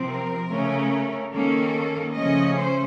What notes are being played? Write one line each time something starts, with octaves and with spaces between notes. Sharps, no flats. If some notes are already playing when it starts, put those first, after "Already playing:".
Already playing: C3 F3 C4
A#4
C#3 A3 C#4
D#3 A#3 C#4 A4
C#3 F3 A3 C#4 D#5
C5